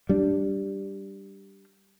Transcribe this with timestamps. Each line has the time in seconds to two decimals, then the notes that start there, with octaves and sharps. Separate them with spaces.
0.09 G3 D4